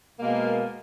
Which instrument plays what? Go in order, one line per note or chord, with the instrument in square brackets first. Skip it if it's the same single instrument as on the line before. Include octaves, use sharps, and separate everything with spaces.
[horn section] B2 G#3 A#3